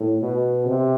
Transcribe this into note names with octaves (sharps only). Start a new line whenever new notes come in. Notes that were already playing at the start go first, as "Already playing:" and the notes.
Already playing: A2
B2
C3